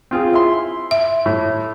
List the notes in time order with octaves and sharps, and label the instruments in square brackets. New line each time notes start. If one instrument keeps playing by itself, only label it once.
[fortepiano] C4 F4 G#4
E4 C6
[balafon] E5
[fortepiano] A2